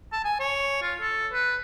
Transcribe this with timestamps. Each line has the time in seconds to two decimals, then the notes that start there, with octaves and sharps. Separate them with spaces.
0.12 A5
0.24 G#5
0.40 C#5
0.82 F4
1.01 A4
1.33 B4